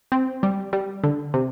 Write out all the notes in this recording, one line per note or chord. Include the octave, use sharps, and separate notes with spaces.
C4
G3
G3
D3
C3